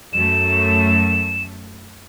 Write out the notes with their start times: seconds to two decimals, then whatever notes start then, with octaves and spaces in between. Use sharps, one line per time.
0.13 F#2 A3 E7